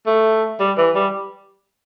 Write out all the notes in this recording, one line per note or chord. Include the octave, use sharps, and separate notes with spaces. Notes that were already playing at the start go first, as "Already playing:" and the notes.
A3
G3
E3
G3